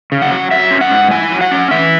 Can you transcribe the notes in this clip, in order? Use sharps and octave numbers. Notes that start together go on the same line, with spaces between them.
C#3
F#5
F#3
F#3 E5
C#4
F#5
G#2
E4 G#5
F#3
F#5
C#4
E3 E5